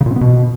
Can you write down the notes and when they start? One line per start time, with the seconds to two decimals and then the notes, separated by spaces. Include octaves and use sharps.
0.01 C#3
0.06 A#2
0.11 C4
0.16 B3
0.21 B2